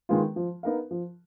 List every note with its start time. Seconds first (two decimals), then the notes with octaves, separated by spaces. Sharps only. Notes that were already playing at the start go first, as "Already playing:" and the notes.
0.09 D#3 G#3 B3 F4
0.36 F3
0.63 B3 D#4 A#4 F5
0.91 F3